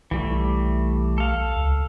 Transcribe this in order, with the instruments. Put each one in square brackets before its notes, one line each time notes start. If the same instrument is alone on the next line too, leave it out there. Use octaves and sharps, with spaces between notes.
[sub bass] B1 [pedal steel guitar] E3 G3 A3
[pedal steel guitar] A4 F5
[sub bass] C#2